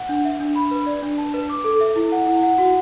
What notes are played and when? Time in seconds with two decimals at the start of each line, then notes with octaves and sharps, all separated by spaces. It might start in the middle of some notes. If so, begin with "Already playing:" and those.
Already playing: F#5
0.09 D4
0.25 E5
0.40 D4
0.56 B5
0.71 B4
0.86 D5
1.02 D4
1.18 A5
1.34 B4
1.50 D6
1.64 A4
1.81 E5
1.96 E4
2.12 F#5
2.27 E4
2.43 F#5
2.58 F#4